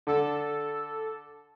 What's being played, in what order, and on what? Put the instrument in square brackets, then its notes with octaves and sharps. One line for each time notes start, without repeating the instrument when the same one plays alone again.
[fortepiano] D3 [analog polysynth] A4